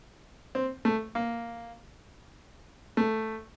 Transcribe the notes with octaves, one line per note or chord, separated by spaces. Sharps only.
C4
A3
A#3
A3